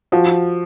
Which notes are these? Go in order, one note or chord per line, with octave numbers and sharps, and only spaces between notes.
F3 F#4